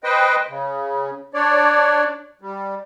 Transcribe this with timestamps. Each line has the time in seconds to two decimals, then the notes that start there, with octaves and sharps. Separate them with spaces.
0.04 B4 C5 D#5 G5
0.49 C#3
1.34 D4 C#5 D5
2.41 G3